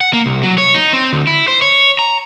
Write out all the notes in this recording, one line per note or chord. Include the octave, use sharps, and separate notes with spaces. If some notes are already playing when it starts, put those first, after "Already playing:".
F#5
A#3
C2
F#3
C#5
D#4
C4
D2
E4
C5
C#5
A#5